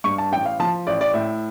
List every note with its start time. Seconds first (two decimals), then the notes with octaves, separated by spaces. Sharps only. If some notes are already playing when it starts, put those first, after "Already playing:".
0.04 G2 C#6
0.18 A5
0.32 A1 G5
0.45 F5
0.60 F3 A5
0.87 A1 D5
1.01 D5
1.14 A2 E5